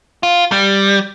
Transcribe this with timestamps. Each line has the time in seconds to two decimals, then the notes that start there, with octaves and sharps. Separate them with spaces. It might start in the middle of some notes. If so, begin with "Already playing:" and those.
0.23 F4
0.52 G3